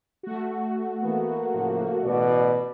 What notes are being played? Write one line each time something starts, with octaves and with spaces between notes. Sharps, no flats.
A3 F#4
E3 A#3 B3
A2 C#3 F3
A1 B2 B4 D5